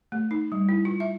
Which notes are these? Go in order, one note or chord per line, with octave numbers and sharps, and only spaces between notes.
A3
D#4
G3
E4
F4
E5